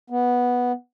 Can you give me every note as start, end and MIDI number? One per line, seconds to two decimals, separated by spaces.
0.10 0.72 59